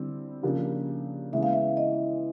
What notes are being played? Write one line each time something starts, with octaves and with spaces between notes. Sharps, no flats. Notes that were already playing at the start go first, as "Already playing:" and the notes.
Already playing: D3 G3 C4 E4
C#3 F3 A#3 D4 G4
C#3 E3 G#3 B3 E5
F5
E5
D#5